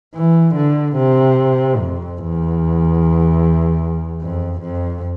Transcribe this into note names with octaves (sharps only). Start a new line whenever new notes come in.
E3
D3
C3
F2
E2
F2
F2